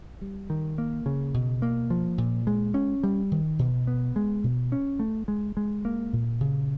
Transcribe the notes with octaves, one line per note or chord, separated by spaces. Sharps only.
G3
D#3
A#3
C#3
B2
A#3
F3
A#2
G#3
C#4
G3
D#3
B2
B3
G#3
B2
C#4
A3
G#3
G#3
A#3
A#2
C#3